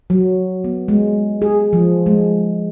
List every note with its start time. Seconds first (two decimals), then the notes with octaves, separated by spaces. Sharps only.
0.10 F#3
0.64 B3
0.88 G#3
1.42 G#4
1.73 F3
2.06 G#3